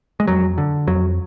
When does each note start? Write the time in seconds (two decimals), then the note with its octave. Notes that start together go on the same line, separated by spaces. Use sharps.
0.20 G#3
0.27 F2 F#3
0.58 D3
0.87 F2 F#3